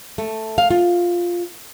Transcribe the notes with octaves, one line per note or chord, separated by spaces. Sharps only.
A3
F5
F4